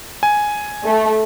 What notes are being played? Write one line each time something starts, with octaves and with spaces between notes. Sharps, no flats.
G#5
A3